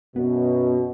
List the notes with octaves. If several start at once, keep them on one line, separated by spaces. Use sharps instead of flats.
F#2 B2 B3